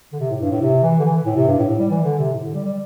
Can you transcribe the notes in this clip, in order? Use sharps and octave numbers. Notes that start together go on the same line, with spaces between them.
D3
C3
A2
G2
A2
C3
E3
D3
E3
A2
C3
G2
A2
A2
G3
E3
D3
C3
A2
D3
G3
G3